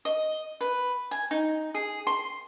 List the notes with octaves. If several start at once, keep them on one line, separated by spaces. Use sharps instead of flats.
D#5
B4
G#5
D#4
G#4
C6